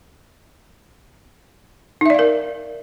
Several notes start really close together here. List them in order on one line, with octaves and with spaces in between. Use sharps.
D#4 E5 D5 F5 A#4